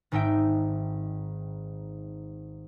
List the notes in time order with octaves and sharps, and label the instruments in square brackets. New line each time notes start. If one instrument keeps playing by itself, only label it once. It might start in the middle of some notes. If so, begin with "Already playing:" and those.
[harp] G#1 G#2 D#4 E5 G5 D7